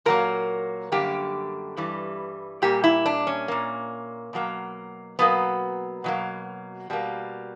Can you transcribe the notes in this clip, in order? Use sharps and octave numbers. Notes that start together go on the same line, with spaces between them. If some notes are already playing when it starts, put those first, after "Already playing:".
A#2 F#3 A#3 A#4
F#2 D3 G3 A#3 G4
G2 E3 G3
A#2 G3 A#3 G4
E4
D4
C#4
A#2 A#3
B2 F#3 A#3
B2 F#3 A#3 B3
B2 F#3 A#3
B2 G3 A#3